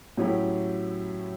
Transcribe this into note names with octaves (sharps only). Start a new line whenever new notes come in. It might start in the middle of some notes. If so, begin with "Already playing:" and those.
A2 F#3 C#4 E4 G4